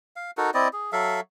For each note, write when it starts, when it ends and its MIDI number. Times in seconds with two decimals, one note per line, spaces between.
0.16 0.31 77
0.37 0.50 63
0.37 0.50 66
0.37 0.50 69
0.37 0.50 70
0.54 0.68 60
0.54 0.68 64
0.54 0.68 74
0.54 0.68 75
0.73 0.91 68
0.92 1.20 54
0.92 1.20 69
0.92 1.20 76
0.92 1.20 77